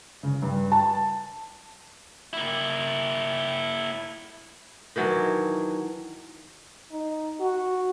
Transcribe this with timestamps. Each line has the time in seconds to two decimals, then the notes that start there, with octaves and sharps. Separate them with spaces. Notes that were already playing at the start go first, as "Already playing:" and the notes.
0.23 C#3
0.42 G2
0.72 A5
2.33 A#3 E4
4.96 D#3 E3 F#3 D4
6.91 D#4
7.40 F#4